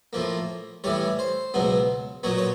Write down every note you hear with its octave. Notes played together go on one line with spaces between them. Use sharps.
A2 F3 A#3
A2 E3 G3 C#5
C5
C#2 B2 F#3 B3
A#2 F#3 B3 C#5
C#5